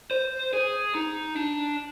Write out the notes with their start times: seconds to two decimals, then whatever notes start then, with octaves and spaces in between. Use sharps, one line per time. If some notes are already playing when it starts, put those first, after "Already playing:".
0.11 C5
0.53 G#4
0.95 D#4
1.36 D4